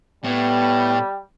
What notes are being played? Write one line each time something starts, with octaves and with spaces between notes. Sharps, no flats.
A2 G3 B3